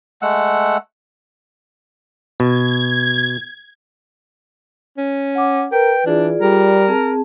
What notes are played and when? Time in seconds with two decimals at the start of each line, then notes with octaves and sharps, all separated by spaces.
0.22 G#3 A3 F#5 E6
2.40 B2 G#6
4.97 C#4
5.35 F#5 D6
5.72 A#4 B4 G5
6.06 E3 D4 F4 G#4 D5
6.41 G3 A#4
6.88 C4 G#4 A5